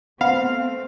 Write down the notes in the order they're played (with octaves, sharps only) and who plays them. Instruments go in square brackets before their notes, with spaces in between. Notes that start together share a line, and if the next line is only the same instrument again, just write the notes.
[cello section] A3 C4 [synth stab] B3 [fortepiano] F5